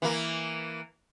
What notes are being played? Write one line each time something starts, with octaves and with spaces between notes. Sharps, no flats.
E3 A#3